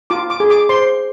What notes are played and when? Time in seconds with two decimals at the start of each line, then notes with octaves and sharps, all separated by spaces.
0.10 F4 D6
0.30 D6
0.40 G#4
0.50 D6
0.69 C5 C6